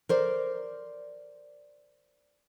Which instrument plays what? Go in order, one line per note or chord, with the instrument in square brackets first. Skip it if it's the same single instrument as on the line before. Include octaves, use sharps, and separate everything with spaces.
[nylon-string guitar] A#4 C5 D5